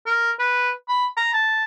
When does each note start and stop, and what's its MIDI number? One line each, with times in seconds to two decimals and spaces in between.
0.06 0.31 70
0.39 0.71 71
0.88 1.07 83
1.17 1.33 82
1.33 1.64 81